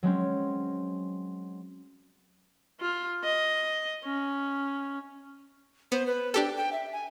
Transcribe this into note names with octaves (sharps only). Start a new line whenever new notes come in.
F#3 G#3 C4 C#4
F4
D#5
C#4
B3 C5
B4
D4 G4 A4 G5
G5
E5
G#5